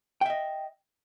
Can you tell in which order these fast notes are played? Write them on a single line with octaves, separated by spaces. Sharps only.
G5 E5 D#5